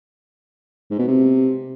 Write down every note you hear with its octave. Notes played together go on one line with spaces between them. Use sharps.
G#2
B2
C3